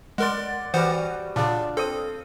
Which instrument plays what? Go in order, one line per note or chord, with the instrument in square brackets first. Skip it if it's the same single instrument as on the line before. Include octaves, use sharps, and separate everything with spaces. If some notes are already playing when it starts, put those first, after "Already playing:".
[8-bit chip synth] G#3 A#4 C6 [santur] D5 F#5
[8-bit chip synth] E3 C5 F#5 [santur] G3 F#4 D#6
[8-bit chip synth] A#2 C#3 [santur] D4 F4
[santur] C4 D#6 [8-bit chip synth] A4